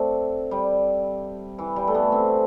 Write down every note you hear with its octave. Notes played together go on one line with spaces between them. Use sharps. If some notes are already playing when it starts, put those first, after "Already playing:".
Already playing: A3 C4 D4
G3
E3
G3
A3
B3
C4